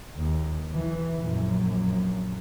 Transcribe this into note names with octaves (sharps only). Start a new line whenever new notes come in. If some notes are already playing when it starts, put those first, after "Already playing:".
D#2
E3
A#1 F#2